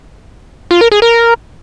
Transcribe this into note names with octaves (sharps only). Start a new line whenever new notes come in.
F4
A#4
G#4
A#4